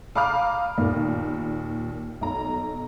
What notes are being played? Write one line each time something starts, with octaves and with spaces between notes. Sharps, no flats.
F5 A#5 B5 D6 D#6 F6
D#2 A#2
B1 A#5